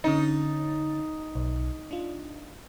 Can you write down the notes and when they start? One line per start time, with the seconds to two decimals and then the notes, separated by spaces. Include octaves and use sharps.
0.04 D3 C#4 D#4 A6
1.35 B1
1.91 D4 F4